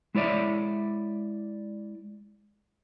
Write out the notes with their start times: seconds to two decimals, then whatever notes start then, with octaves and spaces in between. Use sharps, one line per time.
0.15 G#3 E4 C#5 D5 E5